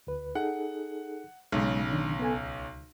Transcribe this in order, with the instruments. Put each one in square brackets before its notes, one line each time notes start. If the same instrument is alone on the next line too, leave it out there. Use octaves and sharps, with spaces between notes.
[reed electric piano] D2 B4
[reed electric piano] D#4 G#4 A4 [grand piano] F#5
[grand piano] B1 C#3 [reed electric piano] G#3
[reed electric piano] D#3 D4
B3 A4 G#5
C#2